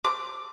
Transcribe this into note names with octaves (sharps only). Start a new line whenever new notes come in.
D6